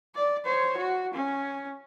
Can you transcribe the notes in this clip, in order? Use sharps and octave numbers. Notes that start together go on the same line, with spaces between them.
D5
C5 C#5
F#4
C#4